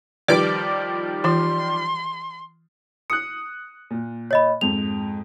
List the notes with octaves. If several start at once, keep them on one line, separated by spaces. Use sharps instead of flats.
D#3 F3 G3 B4 D5 D6
E3 F4 C6
D#6 F#6 C#7
A#2
C#5 D#5 B5
F2 G#2 F7